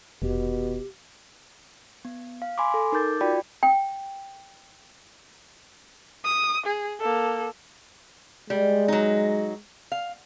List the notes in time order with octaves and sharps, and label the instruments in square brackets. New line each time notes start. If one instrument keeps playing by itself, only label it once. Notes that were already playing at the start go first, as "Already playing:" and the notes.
[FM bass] F1 [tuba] B2 [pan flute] G4
[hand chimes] B3
F5
G#5 B5 C6 D6
A4
D#4 A#4 D6 G6 A6
F4 F#4 D5 G5 B5
[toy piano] G5
[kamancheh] D#6
G#4
A#3 A4
[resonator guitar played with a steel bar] G3 [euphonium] G#3
[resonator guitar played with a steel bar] F#3 D#4
F5